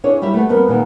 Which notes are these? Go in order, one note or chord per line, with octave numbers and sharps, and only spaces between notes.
D4 E4 G#4 C#5
G3 E4 G4 E5
A3 B3
F2 G3 B3 A#4 B4
A#2 D#3 G#3 B3